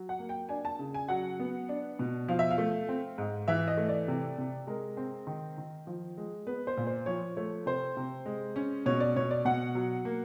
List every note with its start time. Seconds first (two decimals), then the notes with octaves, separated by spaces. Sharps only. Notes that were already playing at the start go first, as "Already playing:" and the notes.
Already playing: F#3
0.09 F#5
0.19 A#3
0.29 G5
0.49 D4 G#5
0.65 A5
0.79 C#3
0.94 G#5
1.09 F#3 F#5
1.39 B3
1.69 D4
1.99 B2
2.28 F3 F5
2.39 E5
2.50 F5
2.58 A3
2.89 C4
3.18 G#2
3.48 E3 E5
3.68 D#5
3.77 A3
3.89 D5
4.08 C3
4.38 C3
4.67 G#3 A#4
4.97 C4
5.27 D#3
5.58 D#3
5.87 F3
6.18 G#3
6.47 B3 B4
6.67 C5
6.77 A#2
6.87 C5
7.06 F3 C#5
7.37 A3 C#5
7.66 C3 C5
7.97 C3
8.26 G#3
8.56 C#4
8.86 B2 C#5
9.00 D5
9.16 B2 C#5
9.31 D5
9.45 B2 F#5
9.75 F#3
10.05 A#3